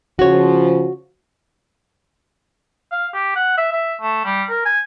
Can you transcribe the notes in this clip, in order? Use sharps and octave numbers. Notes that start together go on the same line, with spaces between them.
C#3 F3 F#4 C#5
F5
G4
F#5
E5
E5
A3
G3
A#4
G#5